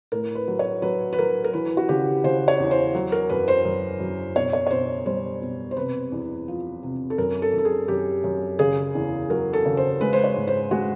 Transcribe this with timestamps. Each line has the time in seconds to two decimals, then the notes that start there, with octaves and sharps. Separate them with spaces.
0.12 A2 A#4
0.35 B4
0.48 F#3
0.59 C#5
0.82 F#3 B4
1.13 B4
1.19 F#3 A#4
1.44 A#4
1.53 E3 B4
1.77 F#4
1.89 C#3 G4
2.24 C#3 C5
2.48 C#5
2.60 E2
2.71 C5
2.95 F#3
3.12 A#4
3.29 F#2 B4
3.48 C5
3.65 F#2
4.00 F#2
4.36 B2 C#5
4.53 C#5
4.67 C#5
4.71 B2 C5
5.06 G3 C5
5.42 B2
5.71 C5
5.77 C3 B4
6.12 E2
6.48 F3
6.83 C3
7.10 A4
7.18 F#2 A#4
7.42 A4
7.53 F#2 A4
7.65 G#4
7.88 F#2 G4
8.24 F#2
8.59 C#3 G#4
8.95 E2
9.30 F#3 A#4
9.53 A4
9.65 C#3
9.77 C5
10.01 G#3 B4
10.13 C5
10.24 C#5
10.36 G#2
10.47 C5
10.71 G#3 F#4